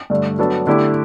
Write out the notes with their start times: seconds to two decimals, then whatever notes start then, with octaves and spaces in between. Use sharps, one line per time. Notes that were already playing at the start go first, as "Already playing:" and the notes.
0.10 G2 D3 A3
0.39 F#3 B3 D4 A4
0.67 D3 A3 E4 G4